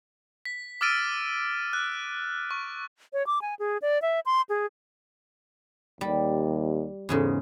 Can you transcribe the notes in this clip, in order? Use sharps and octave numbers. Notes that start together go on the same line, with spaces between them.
B6
D6 E6 F6 A6 D7 D#7
F#6
C#6
C#5
D6
G#5
G#4
D5
E5
C6
G#4
D#2 G3
E2 G#2 C#3